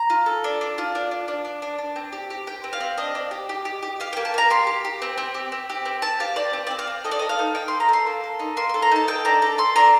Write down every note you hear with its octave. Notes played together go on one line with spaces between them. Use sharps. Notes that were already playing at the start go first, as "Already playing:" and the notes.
Already playing: A#5
F4
A4
D4
D4
F4
D4
D4
D4
D4
D4
D4
C4
G4
G4
G4 G5
C4
F5
C4
D4 D#5
D4
G4
G4
G4
G4
G4 F5
A#3 G5
A5
A#3 A#5
G4 C6
G4
G4
C4
C4
G4
C4
G4
C4
C4 A5
G4 F5
C4 D5
C4
C4 D5
F5
C4
A4 D#5
D5
A4 D#5
F5
D#4
D#4 G5
A4 C6
A#5
A4 C6
A#3
A4
D#4
A#3 C6
A4 C6
A#5
D#4 A5
A4 G5
D4 A#5
A4 A#5
A4 C6
D4 A#5